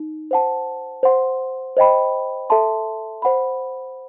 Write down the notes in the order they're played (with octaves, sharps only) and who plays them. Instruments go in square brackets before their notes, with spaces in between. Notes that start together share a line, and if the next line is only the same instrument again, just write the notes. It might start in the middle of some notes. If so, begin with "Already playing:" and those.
Already playing: [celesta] D#4
C5 F#5 A5
C5 F#5 C6
C5 D#5 G5 B5
A4 E5 A5 C6
C5 F#5 B5